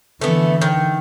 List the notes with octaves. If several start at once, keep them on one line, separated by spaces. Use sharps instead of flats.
D3 E3 A3 B3
D#3